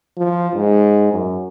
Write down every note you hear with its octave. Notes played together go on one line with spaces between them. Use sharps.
F3
G#2
F#2